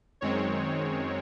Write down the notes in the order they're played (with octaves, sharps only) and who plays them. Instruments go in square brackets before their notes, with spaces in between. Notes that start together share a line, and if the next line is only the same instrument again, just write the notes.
[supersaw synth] F#2 D#3 G#3 C4 C#5